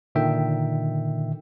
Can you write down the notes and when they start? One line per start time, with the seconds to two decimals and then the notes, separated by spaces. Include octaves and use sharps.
0.15 A#2 D3 D#3 E5 G5